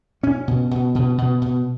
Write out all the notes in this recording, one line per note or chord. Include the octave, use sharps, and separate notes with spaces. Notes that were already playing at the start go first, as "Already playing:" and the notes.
B2 C#4
B2
B2
B2
B2
B2